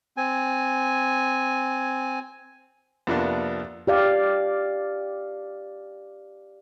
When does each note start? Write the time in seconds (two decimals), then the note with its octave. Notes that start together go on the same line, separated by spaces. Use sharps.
0.17 C4 G#5
3.07 F2 C3 F3 A#3 B3 D4
3.87 G4 D5 F5